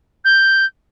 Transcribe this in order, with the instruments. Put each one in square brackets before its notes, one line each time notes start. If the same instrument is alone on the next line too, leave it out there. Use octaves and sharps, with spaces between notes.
[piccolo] G6